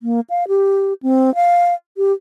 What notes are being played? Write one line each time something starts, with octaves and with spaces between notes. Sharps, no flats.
A#3
F5
G4
C4
F5
G4